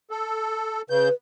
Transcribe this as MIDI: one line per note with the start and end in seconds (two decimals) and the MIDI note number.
0.11 0.82 69
0.90 1.09 49
0.90 1.13 71
0.90 1.09 91